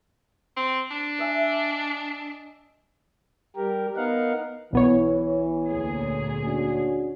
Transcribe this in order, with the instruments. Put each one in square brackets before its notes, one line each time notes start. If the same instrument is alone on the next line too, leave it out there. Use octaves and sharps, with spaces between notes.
[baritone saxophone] C4
D4
[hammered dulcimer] D#5 E5 G#5
[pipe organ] G3 G4 A#4
B3 D#4 A#4 F5 F#5
[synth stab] B1 B3 C#5 [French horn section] E3
[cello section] D2 A#2 G#4
[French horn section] C#4 D4 F#4